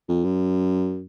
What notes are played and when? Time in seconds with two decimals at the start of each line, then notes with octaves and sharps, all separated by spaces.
0.09 F2
0.24 F#2